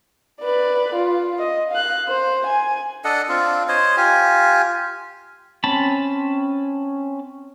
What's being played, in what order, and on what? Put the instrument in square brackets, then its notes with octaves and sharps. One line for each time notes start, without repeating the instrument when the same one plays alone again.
[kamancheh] B4 D5
F4
D#5
F5 F#6
C5
G#5
[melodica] D4 A4 D#5 F#5
C4 D4 F4
C5 C#5 D#5
F4 G4 G#5
[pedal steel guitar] C4 C#4 A5 B5